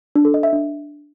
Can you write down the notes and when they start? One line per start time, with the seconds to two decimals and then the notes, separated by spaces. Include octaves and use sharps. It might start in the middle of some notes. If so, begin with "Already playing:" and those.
0.15 D4
0.25 A4
0.34 D#5
0.43 E5
0.53 D4